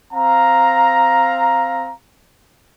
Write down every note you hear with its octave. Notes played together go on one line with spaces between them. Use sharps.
C4 F5 A#5